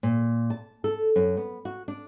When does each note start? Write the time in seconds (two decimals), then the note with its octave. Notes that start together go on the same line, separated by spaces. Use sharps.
0.03 A#2
0.50 A5
0.84 A4
1.16 F#2
1.37 B3
1.65 F#4
1.88 D4